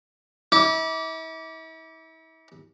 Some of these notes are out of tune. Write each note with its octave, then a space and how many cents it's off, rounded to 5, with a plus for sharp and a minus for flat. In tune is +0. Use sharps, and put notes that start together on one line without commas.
E4 -40 D6 -15